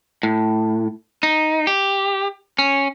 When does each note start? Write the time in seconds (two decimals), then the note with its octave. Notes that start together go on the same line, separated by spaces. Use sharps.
0.23 A2
1.23 D#4
1.67 G4
2.59 C#4